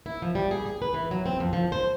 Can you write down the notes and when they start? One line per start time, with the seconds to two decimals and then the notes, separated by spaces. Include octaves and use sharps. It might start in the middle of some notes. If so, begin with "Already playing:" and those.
0.06 E4
0.22 F3
0.35 G3
0.51 G#4
0.66 G#4
0.82 B4
0.94 E3
1.11 F#3
1.26 C4
1.40 F2
1.53 F3
1.72 C5